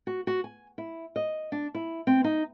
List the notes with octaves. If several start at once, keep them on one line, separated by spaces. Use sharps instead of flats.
F#4
F#4
G#5
E4
D#5
D4
E4
C4
D#4